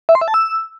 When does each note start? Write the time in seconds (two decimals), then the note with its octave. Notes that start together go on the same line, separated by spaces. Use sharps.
0.09 E5
0.15 C6
0.21 E5
0.28 A5
0.34 E6